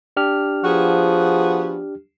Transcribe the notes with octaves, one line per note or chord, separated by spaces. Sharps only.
D4 G4 F6
F3 B3 F#4 G#4